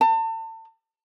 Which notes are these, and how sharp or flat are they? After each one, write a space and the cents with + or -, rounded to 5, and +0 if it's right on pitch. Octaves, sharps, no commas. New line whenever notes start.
A5 +35